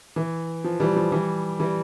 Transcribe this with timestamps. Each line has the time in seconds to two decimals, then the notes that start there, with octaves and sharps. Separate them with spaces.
0.16 E3
0.64 F3
0.80 E3 G3
0.97 F3
1.12 E3 G3
1.60 E3 G3